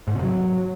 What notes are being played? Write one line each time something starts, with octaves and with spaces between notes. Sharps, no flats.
G#2
C3
F#3